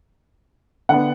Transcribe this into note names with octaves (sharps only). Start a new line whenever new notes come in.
D3 B3 F#5